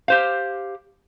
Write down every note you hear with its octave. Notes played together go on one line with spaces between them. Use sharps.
G4 C5 F5